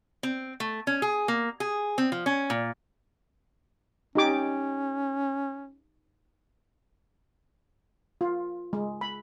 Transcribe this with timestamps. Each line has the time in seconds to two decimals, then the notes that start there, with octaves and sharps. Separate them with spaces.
0.23 C4
0.60 A3
0.87 C#4
1.02 G#4
1.28 A#3
1.60 G#4
1.98 C4
2.12 F3
2.26 C#4
2.50 A#2
4.15 C#4 D#4 G4 D6
8.21 F4
8.73 G#3
9.01 B5